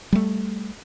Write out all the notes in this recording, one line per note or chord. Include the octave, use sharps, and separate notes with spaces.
G3 A3